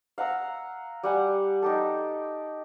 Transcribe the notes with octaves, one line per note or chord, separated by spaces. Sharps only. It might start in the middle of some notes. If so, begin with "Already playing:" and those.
F5 F#5 A#5 E6
G3 F#5 G#5
D#4 G4 A4